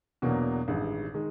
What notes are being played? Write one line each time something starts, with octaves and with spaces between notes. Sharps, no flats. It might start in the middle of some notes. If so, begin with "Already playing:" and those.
E2 B2 F#3 A#3 D4
A1 G2 D#3 G#3
D#3 G#3